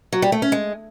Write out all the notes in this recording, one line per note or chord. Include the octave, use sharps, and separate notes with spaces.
F#3
G3
A3
C#4
G#3